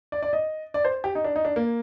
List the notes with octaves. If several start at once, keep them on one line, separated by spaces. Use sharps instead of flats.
D5
D5
D#5
D5
C5
G4
D#4
D4
D#4
D4
A#3